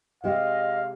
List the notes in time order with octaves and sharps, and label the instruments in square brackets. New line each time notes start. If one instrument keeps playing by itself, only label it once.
[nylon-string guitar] C3 G#3 G4 [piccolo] D#5 [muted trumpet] F5